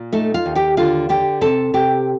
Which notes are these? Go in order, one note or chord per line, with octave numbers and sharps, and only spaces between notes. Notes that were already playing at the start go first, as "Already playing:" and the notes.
Already playing: A#2
A3 D#4 A4
F4 F5
D#2
G4 G5
D3 F4 F5
D3 G4 G5
C3 A4 A5
C3 G4 G5